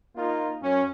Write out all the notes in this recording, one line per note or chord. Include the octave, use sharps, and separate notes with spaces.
A#3 D#4 F4
F#2 C#4